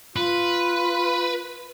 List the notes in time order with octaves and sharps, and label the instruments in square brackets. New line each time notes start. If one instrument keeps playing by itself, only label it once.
[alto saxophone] F4 [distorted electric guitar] B4